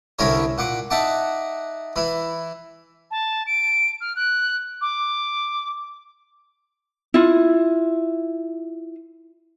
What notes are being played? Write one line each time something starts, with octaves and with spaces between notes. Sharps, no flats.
C2 D3 C#4 E4 A#4 C#5
A#2 F#5 D6
D#4 E5 F#5 A5 D6
E3 E4
A5
D7
F6
F#6
D6
E4 F4